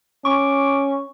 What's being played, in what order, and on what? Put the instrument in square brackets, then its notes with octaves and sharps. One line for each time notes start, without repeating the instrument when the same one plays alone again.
[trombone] C#4 [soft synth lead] C#6 [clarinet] D6